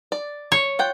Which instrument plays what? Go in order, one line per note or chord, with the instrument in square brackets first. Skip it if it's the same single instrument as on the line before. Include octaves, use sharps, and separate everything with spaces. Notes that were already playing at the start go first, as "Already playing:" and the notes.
[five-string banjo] D5
[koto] C#5
[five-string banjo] F4 F#5 G5